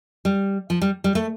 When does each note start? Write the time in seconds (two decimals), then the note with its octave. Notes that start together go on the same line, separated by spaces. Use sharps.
0.25 G3
0.70 F3
0.81 G3
1.04 G3
1.15 A3